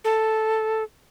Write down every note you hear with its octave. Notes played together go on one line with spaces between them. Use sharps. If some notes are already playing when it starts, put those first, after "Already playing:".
A4